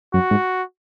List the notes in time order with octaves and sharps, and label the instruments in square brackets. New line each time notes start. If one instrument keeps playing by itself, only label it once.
[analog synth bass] F#2 [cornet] F#4
[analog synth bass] G#2